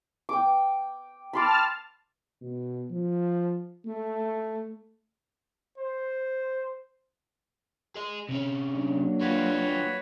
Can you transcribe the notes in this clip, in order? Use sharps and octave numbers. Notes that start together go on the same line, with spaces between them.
G5 D6
A5 B5 C6 D6 F6
B2
F3
A3
C5
G#4 D#5
C3 C#4
F#3 A#3 D4
G3 F4 F#4 B4 C#5